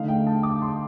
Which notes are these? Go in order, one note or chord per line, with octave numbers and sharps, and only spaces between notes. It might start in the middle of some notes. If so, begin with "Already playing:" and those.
Already playing: D3 A3 D#4 F5
G5
A5
D6
C6